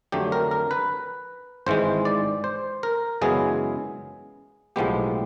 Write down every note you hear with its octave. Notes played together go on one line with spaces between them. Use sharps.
F2 D3 F#3 A3 G4
A#4
A#4
B4
G#1 G#2 E3 G#3 C5
D5
C5
A#4
F#2 C#3 E3 G#3 B3 G#4
B1 A2 F3 G#3 B3 G4